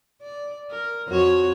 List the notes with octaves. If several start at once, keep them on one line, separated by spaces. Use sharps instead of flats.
D5
A#4
F2 F#4 C#5